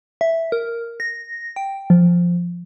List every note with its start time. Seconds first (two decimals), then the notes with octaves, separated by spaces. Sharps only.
0.21 E5
0.52 A#4
1.00 A#6
1.56 G5
1.90 F3